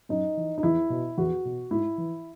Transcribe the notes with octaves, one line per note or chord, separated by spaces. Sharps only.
F#2 D#4
E3
D#4
E2 E4
B2
E2 F#4
B2
G#2 E4
E3